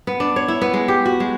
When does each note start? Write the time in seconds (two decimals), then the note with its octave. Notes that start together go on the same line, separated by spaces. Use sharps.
0.07 B3
0.20 D4
0.36 C#5
0.48 E4
0.61 B3
0.74 G#3
0.88 G4
1.05 F#4
1.20 G#3